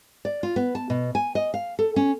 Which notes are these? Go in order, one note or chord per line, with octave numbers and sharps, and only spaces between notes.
D5
F4
B3
A5
B2
G#5
D#5
F5
A4
C#4